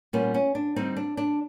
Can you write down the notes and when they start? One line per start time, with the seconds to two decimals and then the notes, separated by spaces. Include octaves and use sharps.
0.13 A#2 G3 B3 C#4
0.34 C#4
0.55 D4
0.76 D3 G3 C4 D#4
0.97 D4
1.17 D4